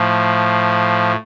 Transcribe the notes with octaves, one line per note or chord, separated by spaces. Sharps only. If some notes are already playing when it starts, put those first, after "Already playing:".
Already playing: A2 F3